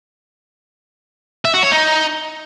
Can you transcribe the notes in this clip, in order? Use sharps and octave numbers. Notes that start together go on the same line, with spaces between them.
E5
F#4
C#5
D#4